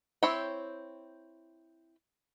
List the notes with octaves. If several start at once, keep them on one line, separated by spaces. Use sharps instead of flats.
C4 E4 C#5 G5